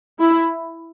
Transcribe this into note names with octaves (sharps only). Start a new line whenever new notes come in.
E4